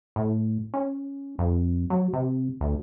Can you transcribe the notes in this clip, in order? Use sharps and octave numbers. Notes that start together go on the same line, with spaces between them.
A2
C#4
F2
F#3
C3
D2